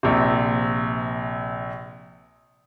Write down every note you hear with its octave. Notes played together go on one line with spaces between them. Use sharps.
A#1 C3